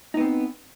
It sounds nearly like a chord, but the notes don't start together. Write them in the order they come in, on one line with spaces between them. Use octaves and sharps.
D#4 B3 C4